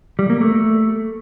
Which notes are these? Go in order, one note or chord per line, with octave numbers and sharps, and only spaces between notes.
G3
A#3
A3